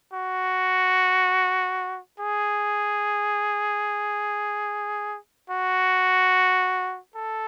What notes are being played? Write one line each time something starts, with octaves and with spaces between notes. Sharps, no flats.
F#4
G#4
F#4
A4